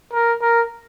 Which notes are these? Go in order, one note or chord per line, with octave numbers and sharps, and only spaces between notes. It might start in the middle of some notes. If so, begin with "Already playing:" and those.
A#4
A#4